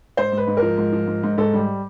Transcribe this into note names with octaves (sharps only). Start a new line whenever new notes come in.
G#2 C5
G#2
B4
G#2
A#4
F3
G#2
F3
G#2
G#2
G#2 A4
G3